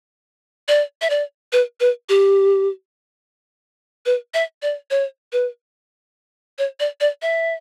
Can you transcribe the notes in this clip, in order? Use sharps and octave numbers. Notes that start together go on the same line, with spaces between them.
D5
E5
D5
B4
B4
G4
B4
E5
D5
C#5
B4
C#5
D5
D5
E5